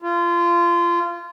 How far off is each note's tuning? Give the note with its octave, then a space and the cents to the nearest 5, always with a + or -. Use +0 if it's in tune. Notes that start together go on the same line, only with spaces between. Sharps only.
F4 -25